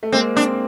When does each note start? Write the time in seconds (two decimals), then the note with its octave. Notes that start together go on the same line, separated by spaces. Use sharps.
0.03 A3
0.12 G#3 A#3 C4
0.35 A#3 C4 D4